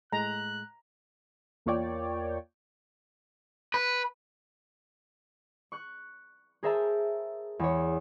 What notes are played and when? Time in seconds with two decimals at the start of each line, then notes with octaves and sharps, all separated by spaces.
0.12 A2 G#3 A#5 F#6
1.66 E2 A#3 F4 C#5 D5 G5
3.74 B4
5.72 C#6 F#6
6.63 G#4 A#4 C5 E5 A5 A#5
7.59 E2 C#5